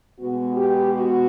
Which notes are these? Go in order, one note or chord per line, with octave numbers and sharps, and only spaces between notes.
B2 G#3 B3 F#4
G4
F#4